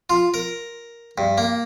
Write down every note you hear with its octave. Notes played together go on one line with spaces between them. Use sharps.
F4
A#4
G2
A#3